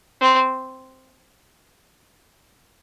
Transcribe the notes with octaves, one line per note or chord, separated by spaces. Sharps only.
C4